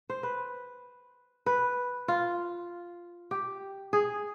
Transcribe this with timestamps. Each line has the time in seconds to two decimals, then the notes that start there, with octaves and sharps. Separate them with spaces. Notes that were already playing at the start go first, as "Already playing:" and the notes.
0.10 C5
0.23 B4
1.46 B4
2.08 F4
3.31 G4
3.93 G#4